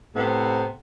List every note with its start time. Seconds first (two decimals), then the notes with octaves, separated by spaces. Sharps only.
0.15 A2 C3 B3 A4 C5 F#5